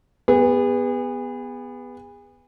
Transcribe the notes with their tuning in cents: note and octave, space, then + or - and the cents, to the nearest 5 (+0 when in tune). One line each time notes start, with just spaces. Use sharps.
B3 +0 G#4 -35